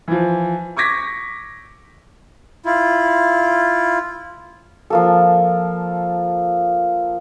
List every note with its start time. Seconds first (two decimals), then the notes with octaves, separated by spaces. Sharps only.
0.08 E3 F3
0.77 C#6 D6 G#6 A#6 B6
2.64 E4 F4
4.90 F3 A#3 A4